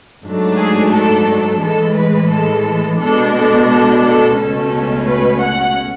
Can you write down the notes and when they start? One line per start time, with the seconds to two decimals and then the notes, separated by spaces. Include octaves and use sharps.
0.24 G#2 F#3 A3 D4
0.58 G#4
0.93 A4
1.61 A2 E3 G#3 A4
1.96 B4
2.30 A4
3.00 B2 G#3 D4 A4
3.34 A4
3.69 A4
4.03 A4
4.38 C#2 B2 A3 C#4 A4
5.07 B4
5.41 F#5